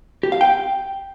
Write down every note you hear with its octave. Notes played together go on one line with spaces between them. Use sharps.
G4
F5
G5